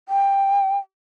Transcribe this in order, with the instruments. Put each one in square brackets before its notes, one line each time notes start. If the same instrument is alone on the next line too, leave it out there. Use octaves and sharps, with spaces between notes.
[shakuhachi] G5